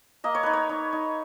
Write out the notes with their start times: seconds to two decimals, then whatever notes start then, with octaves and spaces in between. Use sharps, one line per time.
0.24 A#3 D#5
0.35 C#5
0.43 D#4 B4
0.53 C#5
0.69 D#4
0.93 D#4